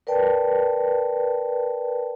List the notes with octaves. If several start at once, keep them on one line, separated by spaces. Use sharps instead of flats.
A#4 B4 D5 G5 A5